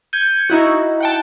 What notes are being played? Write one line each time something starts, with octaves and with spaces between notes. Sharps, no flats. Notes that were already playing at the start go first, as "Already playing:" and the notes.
G6 G#6 C#7 D#7
D#4 E4 F#4
F#5 G5 A5